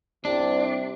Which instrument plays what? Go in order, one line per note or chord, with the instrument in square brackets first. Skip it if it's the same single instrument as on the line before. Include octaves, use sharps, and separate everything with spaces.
[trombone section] C2 C3 [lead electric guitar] D4